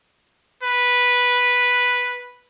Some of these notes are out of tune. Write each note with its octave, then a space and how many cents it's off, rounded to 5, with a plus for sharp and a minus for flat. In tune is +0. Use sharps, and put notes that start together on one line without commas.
B4 -5